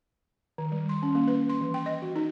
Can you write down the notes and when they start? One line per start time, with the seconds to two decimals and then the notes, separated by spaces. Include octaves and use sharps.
0.58 D#3
0.72 G3
0.89 C6
1.03 C#4
1.15 A#3
1.27 B4
1.49 C6
1.61 E3
1.74 G5
1.86 D#5
2.02 F#4
2.16 D#4